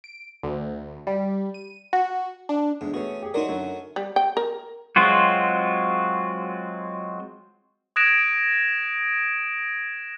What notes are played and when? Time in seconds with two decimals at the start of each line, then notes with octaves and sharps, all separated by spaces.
0.04 D7
0.43 D2
1.07 G3
1.54 D#7
1.93 F#4
2.49 D4
2.81 E2 G#2 D3
2.94 A3 B3 C#4 F#4 G#4
3.23 G4 G#4
3.34 F#3 A3 D#4 F#4 A#4 D5 C6
3.48 F#2 D3
3.96 G3
4.16 G5
4.37 A#4
4.96 F#3 G#3 C4 F4 F#4
7.96 D#6 F#6 G#6 A#6 D7 E7